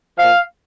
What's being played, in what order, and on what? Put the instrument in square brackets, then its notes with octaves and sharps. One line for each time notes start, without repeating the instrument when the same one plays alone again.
[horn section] A#2 F3 F5